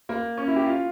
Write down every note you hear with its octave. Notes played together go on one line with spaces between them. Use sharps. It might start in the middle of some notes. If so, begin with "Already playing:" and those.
A#3
C#4
E4
G4
F4